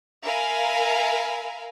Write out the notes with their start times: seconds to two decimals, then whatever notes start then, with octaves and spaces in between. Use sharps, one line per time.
0.24 A#4 E5 F5 G#5 B5